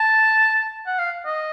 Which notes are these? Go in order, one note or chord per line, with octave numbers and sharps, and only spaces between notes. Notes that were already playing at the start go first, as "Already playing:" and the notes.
Already playing: A5
F#5
F5
D#5